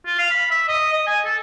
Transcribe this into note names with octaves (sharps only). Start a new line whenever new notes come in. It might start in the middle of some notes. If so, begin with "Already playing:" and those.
F4
F5
B5
E5
D#5
D#5
G#5
A4